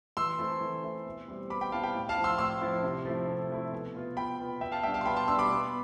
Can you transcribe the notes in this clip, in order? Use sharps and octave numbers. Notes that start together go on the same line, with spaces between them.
E3 C6 E6
A3 C4 E4
E3
A3 C4 E4
B2
G3 C4 E4
B2 B5 D6
G5 B5
G3 C4 E4 F5 A5
G5 B5
A2
F5 A5
F3 C4 E4
C6 E6
A2 C6 E6
F3 C4 E4
C3
F3 A3 E4
C3
F3 A3 E4
B2
B3 F4
B2 G5 B5
B3 F4
B2 E5 G5
F5 A5
G3 D4 E5 G5
F5 A5
C6
B2 G5 B5
A5 C6
G3 D4 C6 E6
B5 D6
B2